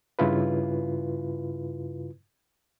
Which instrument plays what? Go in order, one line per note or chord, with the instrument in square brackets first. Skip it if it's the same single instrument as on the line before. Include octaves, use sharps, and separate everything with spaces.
[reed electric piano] G2 C#3 E4 F4 B4